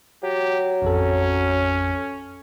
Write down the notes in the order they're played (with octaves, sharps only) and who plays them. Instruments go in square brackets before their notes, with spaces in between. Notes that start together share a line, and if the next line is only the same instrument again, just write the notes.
[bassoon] F#3 [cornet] G4
[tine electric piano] A1 F2 A4 [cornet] C#4